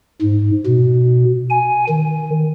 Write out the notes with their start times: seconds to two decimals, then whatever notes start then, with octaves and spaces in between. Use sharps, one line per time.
0.21 G#2
0.66 B2
1.50 G#5
1.89 D#3